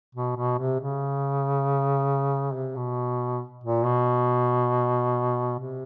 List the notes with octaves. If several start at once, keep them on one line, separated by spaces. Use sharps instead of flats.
B2
B2
C3
C#3
C3
B2
A#2
B2
C3